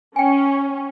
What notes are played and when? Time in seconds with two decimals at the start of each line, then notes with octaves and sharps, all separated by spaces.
0.16 C#4 G5 G#5